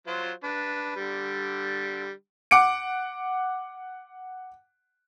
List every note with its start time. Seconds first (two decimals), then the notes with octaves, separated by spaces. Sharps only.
0.07 F#3 F4 C5
0.44 D4 B4
0.96 D3 G3
2.51 F#5 D6 C#7 D7